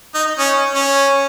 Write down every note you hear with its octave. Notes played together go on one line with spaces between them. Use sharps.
D#4
C#4
C#4